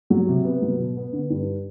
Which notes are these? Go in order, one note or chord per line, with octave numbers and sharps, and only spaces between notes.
F#3
C3
B3
F#3
B2
B3
D3
G2